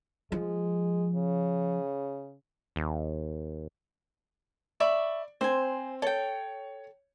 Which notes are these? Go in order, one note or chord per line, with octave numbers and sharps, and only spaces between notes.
F3 G#3
C#3
D#2
D5 E5 B5 C#6
C4 C5 G#5
A4 C#5 G5